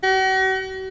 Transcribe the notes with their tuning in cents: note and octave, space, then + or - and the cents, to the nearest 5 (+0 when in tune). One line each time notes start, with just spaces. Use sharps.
F#4 +45